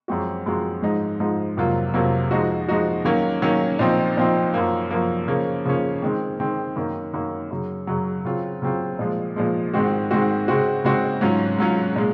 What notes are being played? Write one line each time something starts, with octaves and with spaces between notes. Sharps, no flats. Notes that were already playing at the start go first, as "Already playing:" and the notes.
F#2 F3 G#3 C4 F#4
F#2 F3 G#3 C4 F#4
G#2 F3 G#3 D#4
G#2 F3 G#3 D#4
F2 C3 F#3 A#3 F4
F2 C3 F#3 A#3 F4
F3 G#3 D#4 F#4
F3 G#3 D#4 F#4
D#3 F#3 A#3 C#4
D#3 F#3 A#3 C#4
A#2 F3 C4 D#4
A#2 F3 C4 D#4
F#2 F3 A#3
F#2 F3 A#3
C#3 F3 A#3 C#4
C#3 F3 A#3 C#4
D#3 G#3 C4
D#3 G#3 C4
F#2 D#3 A#3
F#2 D#3 A#3
F#2 C#3 F#3
F#2 C#3 F#3
C#3 F#3 C4 F4
C#3 F#3 C4 F4
A#2 F3 G#3
A#2 F3 G#3
G#2 D#3 G#3 C4 F#4
G#2 D#3 G#3 C4 F#4
C#3 G#3 C4 F#4
C#3 G#3 C4 F#4
G#2 F#3 C#4 F4
G#2 F#3 C#4 F4
A#2 G#3